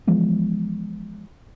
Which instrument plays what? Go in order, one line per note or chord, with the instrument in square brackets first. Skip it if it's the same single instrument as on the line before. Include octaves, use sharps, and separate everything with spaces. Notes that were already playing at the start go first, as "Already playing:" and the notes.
[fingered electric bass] E3 F3 G#3 B3